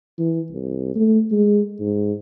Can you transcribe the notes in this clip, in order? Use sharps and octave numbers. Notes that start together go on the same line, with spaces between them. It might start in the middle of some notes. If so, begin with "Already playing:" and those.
E3
C2
A3
G#3
G#2